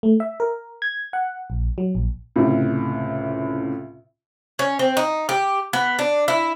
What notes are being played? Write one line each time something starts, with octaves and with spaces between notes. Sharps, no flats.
A3
E5
A#4
G#6
F#5
A#1
F#3
A#1
C#2 A2 C3
C#4
C4
D#4
G4
B3
D4
E4